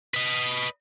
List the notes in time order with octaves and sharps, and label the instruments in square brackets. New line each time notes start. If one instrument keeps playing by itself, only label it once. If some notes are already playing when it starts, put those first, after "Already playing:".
[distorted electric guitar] B4 D#5